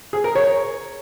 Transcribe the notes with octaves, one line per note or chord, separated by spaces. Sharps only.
G#4
A#4
C#5